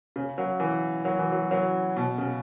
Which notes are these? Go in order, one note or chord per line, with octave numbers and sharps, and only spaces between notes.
C#3
F#3
E3
F#3
E3
F#3
F#3
B2
C#3